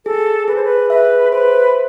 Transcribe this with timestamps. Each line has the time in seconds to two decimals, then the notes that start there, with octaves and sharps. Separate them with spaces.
0.05 G#4 A4
0.48 G#4 B4
0.55 C5
0.64 B4
0.90 B4 E5
1.32 B4 C5